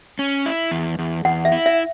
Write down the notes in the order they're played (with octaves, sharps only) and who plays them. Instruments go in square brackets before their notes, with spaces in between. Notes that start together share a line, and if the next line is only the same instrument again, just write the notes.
[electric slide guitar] C#4
E4
E2
E2
[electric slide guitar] E2 [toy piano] F#5
[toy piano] E5
[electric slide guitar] E4
[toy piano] E5